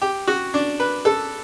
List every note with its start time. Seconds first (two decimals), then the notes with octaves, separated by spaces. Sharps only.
0.02 G4
0.28 F#4
0.54 D4
0.80 B4
1.05 A4